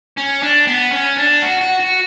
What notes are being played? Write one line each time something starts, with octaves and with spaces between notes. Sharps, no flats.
C#4
D4
B3
C#4
D4
F#4
F#4
F#4